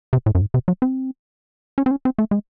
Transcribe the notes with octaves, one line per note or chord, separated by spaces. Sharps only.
C3
A2
F#2
G#2
C3
F#3
C4
C#4
C4
C#4
C4
A3
G#3